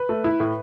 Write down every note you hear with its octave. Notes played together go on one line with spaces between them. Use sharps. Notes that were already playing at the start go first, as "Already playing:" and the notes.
Already playing: B4
A3
E4
A2